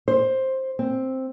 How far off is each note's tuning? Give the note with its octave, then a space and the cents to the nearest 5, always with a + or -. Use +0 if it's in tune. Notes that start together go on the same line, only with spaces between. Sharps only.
C5 +10
C4 +5